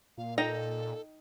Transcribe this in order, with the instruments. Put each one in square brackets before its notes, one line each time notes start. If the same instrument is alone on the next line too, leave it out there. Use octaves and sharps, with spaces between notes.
[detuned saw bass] A#2 [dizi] F5
[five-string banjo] D#4 G5 A#5 [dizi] A4